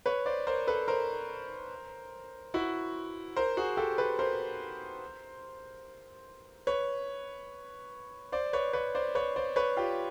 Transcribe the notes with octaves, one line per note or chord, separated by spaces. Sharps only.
B4 C#5
C5 D5
A#4 C5
A4 B4
A#4 C5
E4 F#4
A#4 C5
F#4 G#4
G4 A4
A4 B4
A#4 C5
B4 C#5
C5 D5
B4 C#5
B4 C#5
C5 D5
B4 C#5
C5 D5
B4 C#5
F4 G4